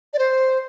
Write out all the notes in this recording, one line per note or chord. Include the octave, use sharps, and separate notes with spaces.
D5
C5